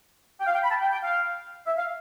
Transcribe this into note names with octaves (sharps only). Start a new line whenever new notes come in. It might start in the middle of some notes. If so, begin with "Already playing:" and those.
G5
F5
G5
B5
A5
G5
G5
F5
E5
F5